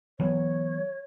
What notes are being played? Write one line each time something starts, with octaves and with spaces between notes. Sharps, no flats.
E3 F#3 B3 C#5